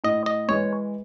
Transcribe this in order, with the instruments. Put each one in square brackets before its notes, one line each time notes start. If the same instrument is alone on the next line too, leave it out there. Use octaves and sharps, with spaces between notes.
[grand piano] A2 [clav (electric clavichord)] D#5
[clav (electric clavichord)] D#5
[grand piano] E3 G#3 [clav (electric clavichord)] C#5